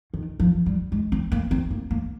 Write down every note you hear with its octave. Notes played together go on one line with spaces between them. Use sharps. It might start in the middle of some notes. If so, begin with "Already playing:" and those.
D#3
F3
G3
G#3
C4
A#3
C4
A#3
A#3